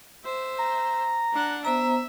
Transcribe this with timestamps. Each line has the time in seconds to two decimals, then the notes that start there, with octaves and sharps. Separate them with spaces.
0.24 C5 E5
0.59 A#5
1.33 D4 F#5
1.65 B3 C5 E5 A#5